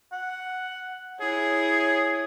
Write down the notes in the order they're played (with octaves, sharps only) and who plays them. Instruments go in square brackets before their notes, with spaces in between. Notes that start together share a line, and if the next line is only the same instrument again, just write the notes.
[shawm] F#5
[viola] E4 C#5 [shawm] G#4